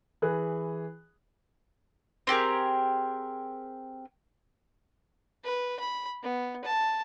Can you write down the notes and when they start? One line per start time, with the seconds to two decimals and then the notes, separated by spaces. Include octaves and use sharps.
0.22 E3 G#4 B4 F#6
2.27 C4 G4 G#4 A#4
5.44 B4
5.80 B5
6.23 B3
6.64 A5